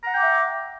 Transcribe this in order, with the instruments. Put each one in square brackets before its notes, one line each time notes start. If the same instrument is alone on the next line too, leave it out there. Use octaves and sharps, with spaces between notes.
[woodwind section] A#5
F#5
G5
D6
E5